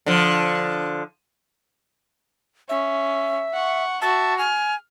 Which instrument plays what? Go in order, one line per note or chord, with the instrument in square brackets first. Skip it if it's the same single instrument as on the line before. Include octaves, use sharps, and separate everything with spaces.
[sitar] D3 F3
[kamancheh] C#4 [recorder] E5
[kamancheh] F#5 C#6
[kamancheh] F#4 E5 [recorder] A5
[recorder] G#5 [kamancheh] F6